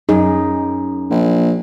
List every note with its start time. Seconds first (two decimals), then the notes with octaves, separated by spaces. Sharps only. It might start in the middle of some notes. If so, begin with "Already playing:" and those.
0.09 F#2 D#4 G#4
1.10 A#1